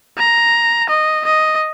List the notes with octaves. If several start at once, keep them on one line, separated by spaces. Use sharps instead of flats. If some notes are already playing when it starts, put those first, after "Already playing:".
A#5
D#5
D#5